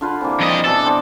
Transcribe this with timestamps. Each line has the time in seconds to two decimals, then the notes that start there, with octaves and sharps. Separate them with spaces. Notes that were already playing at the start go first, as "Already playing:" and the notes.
0.01 D3 F4 B4
0.21 C3 E3 A#3
0.40 F2 D#5
0.65 B2 E3 D4 A4
0.84 B3 C4 D6